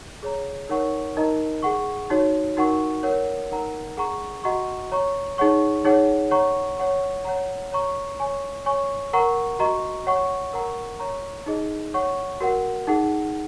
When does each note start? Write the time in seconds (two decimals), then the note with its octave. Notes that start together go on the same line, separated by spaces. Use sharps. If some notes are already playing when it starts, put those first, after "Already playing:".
0.23 G#4 C#5 A#5
0.69 D#4 A#4 C#5 F#5 C#6
1.17 D#4 A#4 D#5 A#5
1.62 G#4 F#5 C#6
2.10 D#4 F#4 C#5
2.57 D#4 F#4 A#4 F#5 C#6
3.03 A#4 C#5 F#5
3.51 D#4 A#4 F#5 A#5
3.97 G#4 F#5 A#5 C#6
4.44 F#4 D#5 F#5 A#5 C#6
4.92 C#5 A#5 C#6
5.38 D#4 G#4 C#5 F#5 C#6
5.85 D#4 G#4 C#5 F#5
6.31 C#5 F#5 A#5 C#6
6.78 C#5 F#5 C#6
7.25 C#5 F#5 A#5
7.72 C#5 A#5 C#6
8.19 C#5 G#5 C#6
8.66 C#5 G#5 C#6
9.13 A#4 F#5 A#5 C#6
9.59 F#4 D#5 A#5 C#6
10.06 C#5 F#5 C#6
10.53 A#4 F#5 A#5 C#6
11.00 C#5 A#5 C#6
11.46 D#4 G#4 D#5
11.94 C#5 F#5 C#6
12.41 F#4 A#4 F#5
12.87 D#4 G#4 F#5